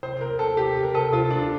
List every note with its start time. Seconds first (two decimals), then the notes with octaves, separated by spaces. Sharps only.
0.03 C3 C5
0.21 C3 A#4
0.39 C3 A4
0.57 C3 G4
0.75 C3
0.83 A#4
0.94 C3 A4
1.13 C3 F4
1.31 C3 D4